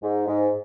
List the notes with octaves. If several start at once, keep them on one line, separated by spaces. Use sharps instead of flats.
G#2
G#2